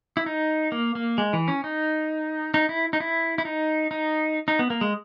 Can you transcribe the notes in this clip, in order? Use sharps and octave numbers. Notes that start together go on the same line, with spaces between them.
E4
D#4
A#3
A#3
G#3
E3
C#4
D#4
D#4
E4
D#4
E4
E4
D#4
D#4
D#4
B3
A#3
G#3